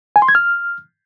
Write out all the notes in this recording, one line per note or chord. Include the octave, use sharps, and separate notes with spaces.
G#5
C6
G#6
F6